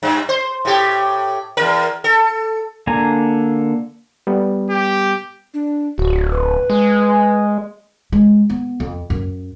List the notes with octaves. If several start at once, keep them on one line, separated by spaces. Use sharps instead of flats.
G2
C5
A2 G4
E2 A#4
A4
D3 A#3 D4 G#5 A#5
G3 B3
G4
D4
D1 F#4
B4
G#3
G#3
B3
F2
F#2